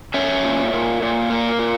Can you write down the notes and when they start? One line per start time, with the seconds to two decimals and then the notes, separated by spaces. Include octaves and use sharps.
0.14 C#4 C#5 E5
0.44 A#2
0.73 A#2
1.02 A#2
1.30 A#3
1.59 A#2